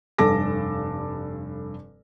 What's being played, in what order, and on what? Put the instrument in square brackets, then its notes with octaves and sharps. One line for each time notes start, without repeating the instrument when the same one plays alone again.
[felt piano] F1 G2 A4 A5 D6 A#6